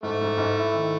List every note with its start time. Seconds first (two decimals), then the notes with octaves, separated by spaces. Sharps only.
0.03 G#2 A3
0.21 G#2
0.38 G#2
0.56 E4
0.74 D#3